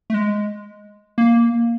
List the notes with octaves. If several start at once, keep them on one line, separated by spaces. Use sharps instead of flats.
A3
G#3
A#3